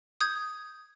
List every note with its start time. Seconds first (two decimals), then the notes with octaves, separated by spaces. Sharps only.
0.21 D#6 G6 G#6